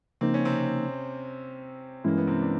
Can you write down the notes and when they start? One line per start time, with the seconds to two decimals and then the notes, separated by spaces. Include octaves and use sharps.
0.21 C#3 F3 A#3 C4 D#4
0.34 C#4
0.45 C3 C4
2.04 G2 E3 G#3 A#3 C#4 E4
2.18 B3
2.27 C3 C4
2.42 D4